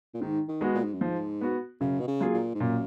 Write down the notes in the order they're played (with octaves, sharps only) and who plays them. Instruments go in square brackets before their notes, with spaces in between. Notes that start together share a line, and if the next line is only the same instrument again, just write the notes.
[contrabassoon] A#2
[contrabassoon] G#2 [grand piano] D#3
[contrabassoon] D#3
[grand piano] G#3 B3 F#4
[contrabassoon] A#2
G#2
F#2
[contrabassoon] G#2 [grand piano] F3
[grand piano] B3 F#4
[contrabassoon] F#2 [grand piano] C#3
[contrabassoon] B2
C#3
[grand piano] F#3 A#3 F4 G#4
[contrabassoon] A#2
G#2
[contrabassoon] F#2 [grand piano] A#2